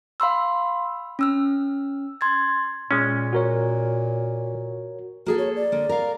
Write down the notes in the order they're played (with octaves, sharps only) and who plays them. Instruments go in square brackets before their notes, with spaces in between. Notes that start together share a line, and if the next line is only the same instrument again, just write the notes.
[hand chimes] F5 B5 C6 E6
C#4 E6 F6
C6 G#6 A6
[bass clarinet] A#2 [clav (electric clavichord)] G#3 C#4
[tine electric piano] F#4 A#4 C#5
[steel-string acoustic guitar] A#3 G#4 A4 [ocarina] F#4
[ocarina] C#5
D5
[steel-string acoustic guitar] D3 A#3
A#4 F5